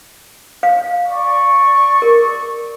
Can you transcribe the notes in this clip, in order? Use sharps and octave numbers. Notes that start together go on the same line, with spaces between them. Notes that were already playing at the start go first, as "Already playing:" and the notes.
F5
D5 C#6
A#4